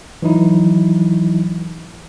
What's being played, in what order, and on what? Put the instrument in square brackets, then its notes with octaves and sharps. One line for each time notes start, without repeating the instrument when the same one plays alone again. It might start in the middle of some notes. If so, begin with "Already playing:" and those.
[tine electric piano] E3 F#3 D#4 E4